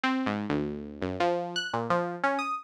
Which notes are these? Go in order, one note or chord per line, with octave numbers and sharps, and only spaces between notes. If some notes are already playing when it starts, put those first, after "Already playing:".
C4
G#2
D2
F#2
F3
F#6
A#2
F3
C#4
D#6